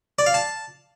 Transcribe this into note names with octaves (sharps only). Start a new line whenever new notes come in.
D5
F5
A5